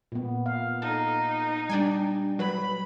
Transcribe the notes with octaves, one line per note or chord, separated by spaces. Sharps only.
A#2 B3
F5
D#4 A4
G3 D4 G5 G#5
F#3 B4 B5